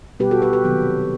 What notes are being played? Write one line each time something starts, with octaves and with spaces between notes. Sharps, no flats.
B2 G3 B3 G4 B4
F#4 A4
G4 B4
G4 B4
C3 D#3 F#3 B3